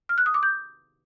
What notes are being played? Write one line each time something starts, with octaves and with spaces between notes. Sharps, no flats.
F6
F#6
D#6
D6
G6